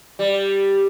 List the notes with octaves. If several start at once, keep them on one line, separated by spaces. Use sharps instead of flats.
G3